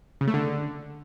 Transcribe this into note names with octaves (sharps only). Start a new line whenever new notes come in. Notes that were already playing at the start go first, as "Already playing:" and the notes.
C#3
A3
D3